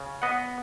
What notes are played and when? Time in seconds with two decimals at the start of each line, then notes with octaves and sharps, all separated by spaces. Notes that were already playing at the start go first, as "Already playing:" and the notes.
Already playing: C#3
0.22 B3 D#5 F#5